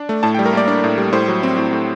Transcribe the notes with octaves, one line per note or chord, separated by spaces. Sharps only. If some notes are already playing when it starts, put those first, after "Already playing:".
Already playing: D4
A3
A2 A5
G5
G3
A#4
A#3 D5
D4 D5
A2
G3
A2 C5
F#3
C4
A2
A2